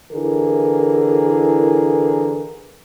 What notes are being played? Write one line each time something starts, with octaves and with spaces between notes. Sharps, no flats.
D3 E3 E4 G#4 A#4